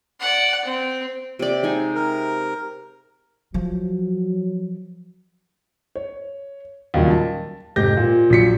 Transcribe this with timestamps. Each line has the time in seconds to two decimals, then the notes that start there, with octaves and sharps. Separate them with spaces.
0.20 D5 F#5
0.65 C4
1.39 C3 D5
1.63 G#3 D#4 G#5
1.95 A#4
3.54 F3 F#3
5.96 C#5
6.94 D#2 A#2 C#3 F#3 G3
7.10 A5
7.76 F1 G#2 G4 G6 A#6
7.97 A#2
8.30 A#1 F#3 B6 C#7